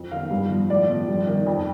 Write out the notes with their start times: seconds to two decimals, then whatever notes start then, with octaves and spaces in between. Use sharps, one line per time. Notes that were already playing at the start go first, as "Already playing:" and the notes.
Already playing: F2
0.11 D#3 F5
0.31 G2
0.50 F3
0.69 A2 D5
0.89 F3
1.08 G2
1.27 D#3
1.46 F2